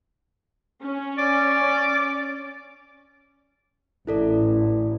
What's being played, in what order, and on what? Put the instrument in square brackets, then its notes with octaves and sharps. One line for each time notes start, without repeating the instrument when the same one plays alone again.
[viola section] C#4
[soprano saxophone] D5
[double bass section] A1 [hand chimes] E4 A4 D5